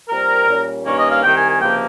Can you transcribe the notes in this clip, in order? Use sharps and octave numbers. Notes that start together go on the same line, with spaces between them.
A#2 G3 C4 A#4
A#2 G3 C#4
G2 D#3 A#3 C#4 C#5
D#5
F5
C2 C3 D#3 G5
G#5
G#5
C#2 C3 F3 A#3 G5